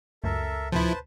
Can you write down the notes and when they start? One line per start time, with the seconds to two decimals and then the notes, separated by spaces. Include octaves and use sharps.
0.24 C#2 F#2 A3 A4 A#4 E5
0.72 D2 A2 C3 F3 E4 B4 C5 A5